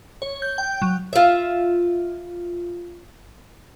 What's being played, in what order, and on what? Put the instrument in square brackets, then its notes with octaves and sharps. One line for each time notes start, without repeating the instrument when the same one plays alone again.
[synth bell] C#5
G6
G5
F#3
[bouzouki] F4 E5